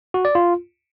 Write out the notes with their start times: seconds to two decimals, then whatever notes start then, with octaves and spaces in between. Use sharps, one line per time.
0.14 F#4
0.25 D5
0.35 F4